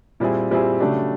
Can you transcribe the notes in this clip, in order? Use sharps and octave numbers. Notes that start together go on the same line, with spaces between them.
A#2 G3 C4 E4 G#4
A#2 G3 C4 E4 G#4
C#3 F#3 A3 D4 G4